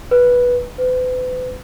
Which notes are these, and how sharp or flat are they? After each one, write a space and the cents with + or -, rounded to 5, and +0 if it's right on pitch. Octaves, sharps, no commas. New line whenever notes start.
B4 -10
B4 +40